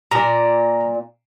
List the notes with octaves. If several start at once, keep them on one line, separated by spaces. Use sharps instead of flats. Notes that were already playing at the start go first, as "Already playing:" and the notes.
A#2 D5 A#5